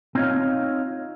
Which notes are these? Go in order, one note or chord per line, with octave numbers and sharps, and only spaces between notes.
C4 D#4 F4 C#5 D#5 F5